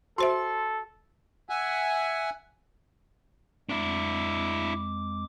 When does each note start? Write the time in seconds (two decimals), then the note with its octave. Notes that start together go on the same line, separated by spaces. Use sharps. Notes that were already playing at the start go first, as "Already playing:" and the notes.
0.18 F#4 A4 C5 E5 C6
1.49 E5 F#5 G#5
3.69 F2 G#3 D4 E4 D6